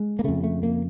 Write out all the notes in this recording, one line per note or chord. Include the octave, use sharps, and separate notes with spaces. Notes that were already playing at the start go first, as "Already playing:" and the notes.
Already playing: G#3
A#3
F2 C#3 A3
A3
A#3